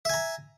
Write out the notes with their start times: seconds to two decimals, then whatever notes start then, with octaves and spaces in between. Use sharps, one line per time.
0.05 E5
0.09 G#5
0.14 A#5